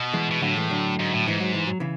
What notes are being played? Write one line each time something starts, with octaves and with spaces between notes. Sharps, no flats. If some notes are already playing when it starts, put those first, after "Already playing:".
Already playing: B2
E3 G#3
B2
A2 D3 F#3
E3 G#3
D3 F#3
G#2
A2
G#2 E3
F#3
E3
F#3
C#3 E3